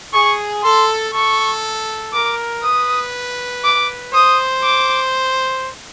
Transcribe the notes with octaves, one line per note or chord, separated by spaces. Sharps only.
G#4 C#6
A4 C6
A4 C#6
A#4 D6
B4 D#6
D6
C5 D#6
D6